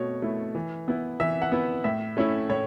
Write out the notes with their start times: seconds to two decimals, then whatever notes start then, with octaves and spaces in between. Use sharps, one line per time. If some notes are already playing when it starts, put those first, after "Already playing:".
Already playing: B2 A3 C#5
0.22 A3 E4
0.55 E3
0.88 B3 E4
1.20 E3 E5
1.42 F#5
1.52 B3 E4
1.84 A2 E5
2.17 A3 C#4 E4
2.50 A2 C#5